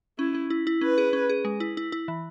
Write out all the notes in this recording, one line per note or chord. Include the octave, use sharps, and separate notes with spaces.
C#4 E4
C#4
E4
E4
C#4 B4
G#4
C#4
G#4
G#3
E4
E4
E4
E3